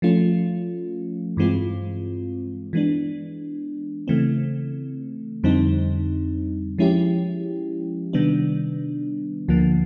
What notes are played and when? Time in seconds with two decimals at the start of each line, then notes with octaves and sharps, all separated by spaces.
0.02 F3 A3 C#4 F4
1.37 G2 E3 G#3 C4 F4
2.73 E3 G#3 B3 D4
4.08 C#3 E3 A3 C4
5.44 F2 D3 G3 C4 D#4
6.78 F3 G#3 C#4 E4 G4
8.13 C3 D#3 G3 B3 D4
9.48 D2 D3 F3 A#3